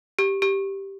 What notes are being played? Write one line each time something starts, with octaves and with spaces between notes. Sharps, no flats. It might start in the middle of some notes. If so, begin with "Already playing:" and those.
G4
G4